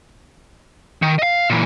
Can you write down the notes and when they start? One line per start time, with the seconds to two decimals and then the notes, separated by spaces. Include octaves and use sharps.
1.02 D#3
1.19 D#5 F5
1.50 A#2 E3